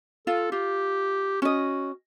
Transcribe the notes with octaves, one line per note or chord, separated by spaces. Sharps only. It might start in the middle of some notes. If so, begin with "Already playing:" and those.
F4 A4
F4 G4
C#4 F#4 D#5